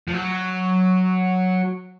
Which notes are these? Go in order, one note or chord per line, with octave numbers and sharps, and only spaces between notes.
F3
F#3